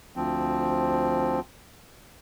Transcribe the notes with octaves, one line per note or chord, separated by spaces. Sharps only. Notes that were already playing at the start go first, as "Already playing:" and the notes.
D2 F3 C4